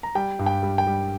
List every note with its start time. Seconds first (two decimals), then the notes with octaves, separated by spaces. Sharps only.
0.03 A#5
0.15 G3 G5
0.39 G2
0.46 G5
0.63 G3
0.78 G5
0.87 G3